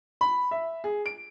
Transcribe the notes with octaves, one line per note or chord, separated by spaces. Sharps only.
B5
E5
G#4
D7